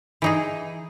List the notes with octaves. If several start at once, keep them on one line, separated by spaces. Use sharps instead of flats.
E3 D#4 G#4